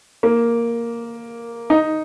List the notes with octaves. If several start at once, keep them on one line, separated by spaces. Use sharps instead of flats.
A#3
D#4